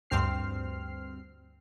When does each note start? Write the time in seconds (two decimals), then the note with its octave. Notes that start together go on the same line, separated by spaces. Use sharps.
0.10 D2 G2 C4 F6 C7